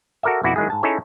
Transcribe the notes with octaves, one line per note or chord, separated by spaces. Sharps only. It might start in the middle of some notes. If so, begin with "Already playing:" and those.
F#4 A4 A#4 D5 E5
F2 B2 E4 F#4 D5 A5
D#3 F#3 G#3 E4 G#4
G#2 A5
C#4 D#4 E4 G#4 A4 C#5